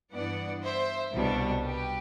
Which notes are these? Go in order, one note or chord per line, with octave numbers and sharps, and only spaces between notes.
G2 E3 B3 D4 D5 F#5
C5 E5
C2 B2 G3 D4
G4 B4